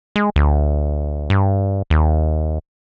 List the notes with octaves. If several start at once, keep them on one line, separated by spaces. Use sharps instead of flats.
G#3
D2
G2
D#2